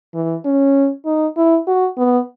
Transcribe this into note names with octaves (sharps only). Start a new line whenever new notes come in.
E3
C#4
D#4
E4
F#4
B3